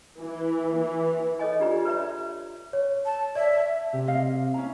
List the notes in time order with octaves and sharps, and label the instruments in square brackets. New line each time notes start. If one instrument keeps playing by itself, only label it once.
[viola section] E3
E3
[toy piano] A4 C#5 D#5 G#5
D4 F4 G4 D5 A#5
B4 C#5 D5 E5 A#5
[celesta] C#5
[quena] A5
[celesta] D5 [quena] E5
[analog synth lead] C3 [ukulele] G4
[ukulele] D#5 F5
C#4 E4 A#5